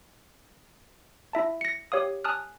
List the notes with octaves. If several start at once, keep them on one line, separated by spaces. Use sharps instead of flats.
E4 E5 A5
A#6 C#7
G4 C#5 F5 D#6
G#5 A5 D#6 F6 F#6